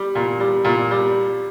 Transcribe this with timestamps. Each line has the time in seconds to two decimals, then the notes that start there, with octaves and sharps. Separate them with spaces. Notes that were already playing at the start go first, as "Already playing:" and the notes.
Already playing: G3
0.15 A#2
0.40 G3
0.64 A#2
0.91 G3